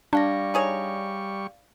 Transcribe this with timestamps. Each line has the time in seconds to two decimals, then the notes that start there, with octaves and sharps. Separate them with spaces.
0.13 G3 D4 D5 F5 C#6 A#6
0.54 D#4 G#4 C#5